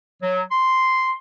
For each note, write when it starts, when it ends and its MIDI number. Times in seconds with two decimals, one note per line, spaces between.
0.22 0.42 54
0.51 1.14 84